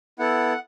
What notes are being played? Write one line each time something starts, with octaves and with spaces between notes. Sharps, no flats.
B3 E4 A4 F#5